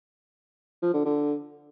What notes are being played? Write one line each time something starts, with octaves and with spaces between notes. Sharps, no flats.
F3
D3
D3